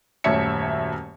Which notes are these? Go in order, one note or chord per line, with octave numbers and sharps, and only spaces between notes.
D#1 F#2 A3 C#5 E5 C#7